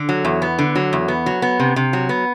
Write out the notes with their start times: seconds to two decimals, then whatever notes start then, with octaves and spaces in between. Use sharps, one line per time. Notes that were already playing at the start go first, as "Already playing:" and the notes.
Already playing: D3
0.09 F#3
0.25 E2
0.42 B3
0.59 D3
0.76 F#3
0.93 E2
1.08 B3
1.26 F#3
1.42 B3
1.60 C3
1.76 C3
1.93 F#3
2.09 B3